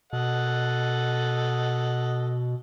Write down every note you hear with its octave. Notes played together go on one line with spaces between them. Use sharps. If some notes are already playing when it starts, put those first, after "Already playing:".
B2 A4 D#5 F#5